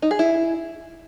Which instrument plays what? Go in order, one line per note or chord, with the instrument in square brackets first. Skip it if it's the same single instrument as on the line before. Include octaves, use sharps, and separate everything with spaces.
[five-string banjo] D#4
G#4
E4